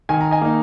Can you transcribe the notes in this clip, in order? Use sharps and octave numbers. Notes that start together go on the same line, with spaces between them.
D#3 G#5
A#5
D#5 G#5
A#3 D#4